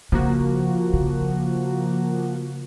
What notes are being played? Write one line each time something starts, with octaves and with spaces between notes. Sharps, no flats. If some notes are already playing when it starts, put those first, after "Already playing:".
C#3 F3 A#3 F#4
C#3